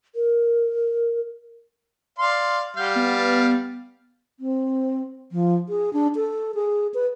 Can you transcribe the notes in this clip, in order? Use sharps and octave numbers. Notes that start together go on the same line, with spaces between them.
A#4
D5 F5 C6
G3 F5 F#5 G6
B3 A6
C4
F3
G#4
D4
A4
G#4
B4